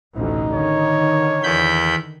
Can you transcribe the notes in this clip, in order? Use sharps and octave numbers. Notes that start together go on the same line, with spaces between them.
A1 D2 B2 D#4
D3 D#3 C#5
E2 B5 G6